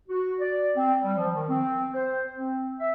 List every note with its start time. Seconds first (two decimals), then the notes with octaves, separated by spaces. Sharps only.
0.09 F#4
0.39 D5
0.75 C4
1.01 G3
1.17 F3
1.34 D#3
1.48 C4
1.93 C5
2.36 C4
2.80 E5